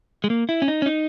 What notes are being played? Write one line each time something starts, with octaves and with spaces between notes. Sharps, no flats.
G#3
A#3
E4
C#4
D#4
C#4
D#4